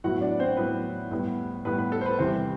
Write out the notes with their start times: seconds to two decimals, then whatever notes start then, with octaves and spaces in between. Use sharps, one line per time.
0.04 A2 F#3 B3 E4 F#4 F#5
0.21 D4 D5
0.39 C4 C5
0.57 A2 F#3 B3 E4 B4
1.11 A2 G3 B3
1.65 A2 G3 B3 B4
1.79 B4
1.92 A4
2.01 C5
2.06 B4
2.19 E2 C3 E3 G3 C4 C5